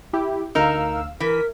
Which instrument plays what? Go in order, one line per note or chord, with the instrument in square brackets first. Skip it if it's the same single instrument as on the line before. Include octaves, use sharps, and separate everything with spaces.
[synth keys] E4 G4
[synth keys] D2 F5 E6 [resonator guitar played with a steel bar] D#4 A#4
[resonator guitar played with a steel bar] E3 [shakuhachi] A#4 [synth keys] B6